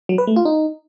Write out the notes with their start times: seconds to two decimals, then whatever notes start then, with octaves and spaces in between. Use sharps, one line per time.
0.09 F#3
0.18 B4
0.27 A3
0.36 F4
0.45 D#4